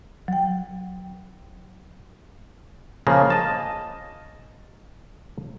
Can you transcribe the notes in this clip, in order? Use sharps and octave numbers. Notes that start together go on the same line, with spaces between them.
F#3 G5
C#3 F3 A#3
D#5 A5